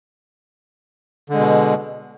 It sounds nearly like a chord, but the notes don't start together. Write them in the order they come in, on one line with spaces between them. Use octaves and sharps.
D3 G#3 B2